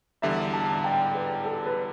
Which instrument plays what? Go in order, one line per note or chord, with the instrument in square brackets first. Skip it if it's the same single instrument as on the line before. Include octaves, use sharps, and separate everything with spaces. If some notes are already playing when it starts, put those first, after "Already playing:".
[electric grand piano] E2 D3 G3 [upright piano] E5
[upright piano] A5
G5
B4
A4
B4